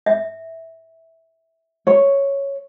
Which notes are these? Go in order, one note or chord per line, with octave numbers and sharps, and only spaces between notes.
E5
C#5